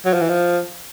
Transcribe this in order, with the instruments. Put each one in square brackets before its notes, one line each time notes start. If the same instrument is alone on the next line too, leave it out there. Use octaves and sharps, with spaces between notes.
[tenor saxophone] F#3
F3
E3
F3